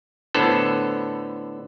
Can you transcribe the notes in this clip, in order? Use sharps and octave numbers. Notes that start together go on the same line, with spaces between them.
A2 D3 B3 A4 C5